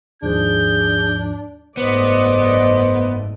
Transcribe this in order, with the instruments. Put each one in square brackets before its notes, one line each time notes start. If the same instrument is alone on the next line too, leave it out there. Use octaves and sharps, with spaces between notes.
[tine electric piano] D#2 G#2 F3 [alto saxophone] D4 [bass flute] G#4 [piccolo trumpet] G6
[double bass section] F#1 G#2 A3 [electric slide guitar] B3 [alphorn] C5 [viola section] D5 D#5